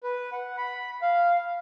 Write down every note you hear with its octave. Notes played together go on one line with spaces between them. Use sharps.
B4
F#5
B5
F5